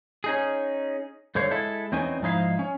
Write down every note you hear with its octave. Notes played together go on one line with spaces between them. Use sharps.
C#4 D#4 G#4
G2 D3 C5 C#5 F5
G#3 E4 A4
E2 C4 C#4 D#4 G#5
G#2 F3 D#4 E4 F5
C#4